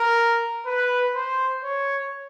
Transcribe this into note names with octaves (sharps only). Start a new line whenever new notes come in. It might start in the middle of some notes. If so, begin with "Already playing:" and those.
Already playing: A#4
B4
C5
C#5